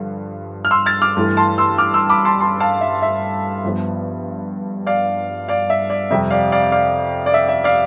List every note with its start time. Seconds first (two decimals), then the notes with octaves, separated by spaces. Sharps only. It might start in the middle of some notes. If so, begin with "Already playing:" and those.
Already playing: G2 D3 F3
0.65 F6
0.71 C6 E6
0.86 F6 A6
1.02 D6 F6
1.17 G2 E3 A3
1.37 A5 C6
1.58 C6 E6
1.78 D6 F6
1.94 C6 E6
2.09 B5 D6
2.25 A5 C6
2.41 A5 C6
2.60 F5 A5
2.81 E5
3.02 E5
3.64 G2 F3 B3
4.86 D5 F5
5.48 D5 F5
5.70 E5
5.90 D5
6.10 F2 C3 G3 E5
6.30 D5 F5
6.52 D5 F5
6.72 D5 F5
7.26 D5
7.34 E5
7.49 E5
7.64 D5 F5